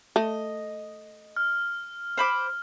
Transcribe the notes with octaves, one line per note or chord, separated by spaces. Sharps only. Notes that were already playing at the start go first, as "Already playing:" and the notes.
A3 D#5
F6
C5 B5 D6